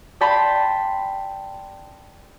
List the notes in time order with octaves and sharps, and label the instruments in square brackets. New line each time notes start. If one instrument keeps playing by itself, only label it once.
[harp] D5 G5 A5 B5 C6